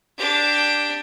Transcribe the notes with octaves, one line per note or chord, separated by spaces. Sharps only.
D4 G4